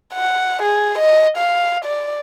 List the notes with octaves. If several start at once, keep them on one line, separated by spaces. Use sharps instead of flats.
F#5
G#4
D#5
F5
D5